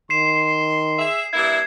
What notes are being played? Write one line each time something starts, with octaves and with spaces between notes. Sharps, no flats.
D#3 C6 C7 E7
G#4 E5
G2 A#3 E4 G#6